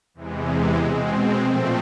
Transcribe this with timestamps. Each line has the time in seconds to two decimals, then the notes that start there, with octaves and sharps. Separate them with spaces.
0.14 E2 C3 E3 G#3
0.78 B2 G#3 C4
1.41 A#2 F3 A3 C4